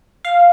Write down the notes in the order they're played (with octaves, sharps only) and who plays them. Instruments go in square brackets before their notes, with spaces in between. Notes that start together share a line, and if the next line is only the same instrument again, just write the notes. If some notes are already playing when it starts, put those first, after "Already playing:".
[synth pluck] F5